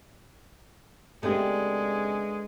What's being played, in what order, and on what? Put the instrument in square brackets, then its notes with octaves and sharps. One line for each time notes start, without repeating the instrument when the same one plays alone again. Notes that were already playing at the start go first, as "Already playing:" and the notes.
[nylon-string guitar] C#3 C4 G4 [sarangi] G#3 [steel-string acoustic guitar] A3 B3 D4